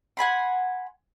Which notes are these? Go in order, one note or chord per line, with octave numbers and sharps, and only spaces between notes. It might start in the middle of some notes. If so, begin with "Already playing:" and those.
F#5 G#5 B5 C6